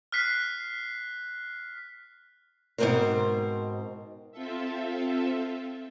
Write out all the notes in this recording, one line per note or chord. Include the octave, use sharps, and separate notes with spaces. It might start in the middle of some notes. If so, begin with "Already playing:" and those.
F6 F#6 B6 C7
G#2 B2 A#3 C4 A#4 C5
C4 F4 A4 E5